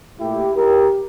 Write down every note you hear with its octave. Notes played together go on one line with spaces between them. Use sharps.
A#2 A3 E4 G4
G4 A#4